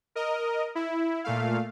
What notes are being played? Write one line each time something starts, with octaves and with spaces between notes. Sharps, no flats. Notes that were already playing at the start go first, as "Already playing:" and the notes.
A#4 D#5
E4
A#2 A3 F5